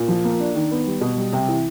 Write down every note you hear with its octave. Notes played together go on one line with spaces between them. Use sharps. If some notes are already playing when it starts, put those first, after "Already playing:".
Already playing: A#2
F3
A#3
D4
D#3
B3
G3
B2
G3
C3
E3